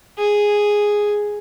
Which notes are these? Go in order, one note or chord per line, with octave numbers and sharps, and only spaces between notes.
G#4